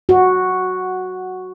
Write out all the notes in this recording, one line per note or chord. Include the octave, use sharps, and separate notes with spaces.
F#4